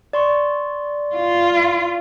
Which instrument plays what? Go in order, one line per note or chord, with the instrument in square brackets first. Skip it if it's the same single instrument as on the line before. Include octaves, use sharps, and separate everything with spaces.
[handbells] D5 C6 C#6
[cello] F4